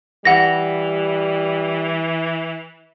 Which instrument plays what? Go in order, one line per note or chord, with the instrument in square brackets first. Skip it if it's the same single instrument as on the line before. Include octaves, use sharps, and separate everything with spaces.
[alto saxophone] E3 [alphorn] G3 [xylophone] F#5 A#6